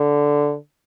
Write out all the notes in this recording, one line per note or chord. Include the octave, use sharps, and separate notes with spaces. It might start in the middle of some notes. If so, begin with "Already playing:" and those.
Already playing: D3